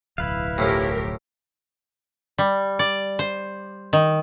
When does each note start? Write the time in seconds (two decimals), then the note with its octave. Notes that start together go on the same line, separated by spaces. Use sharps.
0.18 D1 B1 E4 B4 F5
0.58 A2 F3 C#4 G4 A#4
2.38 G3
2.79 D5
3.19 C5
3.93 D#3